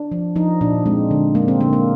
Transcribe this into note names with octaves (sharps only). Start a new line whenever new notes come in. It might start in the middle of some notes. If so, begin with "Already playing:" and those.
Already playing: D4
F3
F3 D#4
A#2 D4
G#3 C4
D3
G#3 A#3
C4
D3 A#3
A#3